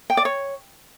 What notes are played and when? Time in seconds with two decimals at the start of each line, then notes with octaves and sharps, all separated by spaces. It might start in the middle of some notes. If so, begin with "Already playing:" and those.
0.10 G5
0.17 D5
0.25 C#5